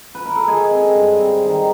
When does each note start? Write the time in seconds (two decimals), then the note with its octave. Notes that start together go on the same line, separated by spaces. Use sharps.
0.15 B4
0.25 A#4
0.36 A4
0.47 G#3 G#4
0.71 C4
0.95 G2
1.19 C4
1.43 D#3